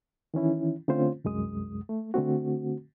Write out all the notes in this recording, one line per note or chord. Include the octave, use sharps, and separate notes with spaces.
D#3 E3 C#4 E4
D3 A3 C4 C#4 F4 C5
C2 F#2 G#3 D#6
A3
D3 A3 C4 F#4